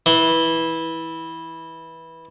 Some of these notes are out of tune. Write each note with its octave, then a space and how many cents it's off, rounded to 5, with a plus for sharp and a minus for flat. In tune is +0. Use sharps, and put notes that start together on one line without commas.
E3 -15